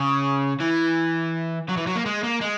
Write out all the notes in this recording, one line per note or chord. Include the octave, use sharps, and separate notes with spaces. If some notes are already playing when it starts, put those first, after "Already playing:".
Already playing: C#3
E3
F#3
E3
F#3
A#3
G#3
A#3
G#3